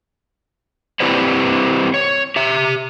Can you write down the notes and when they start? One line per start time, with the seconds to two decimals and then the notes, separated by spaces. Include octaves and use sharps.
1.00 C4 E4 G4 B4 C5 D5
1.94 C#5
2.36 G4 E5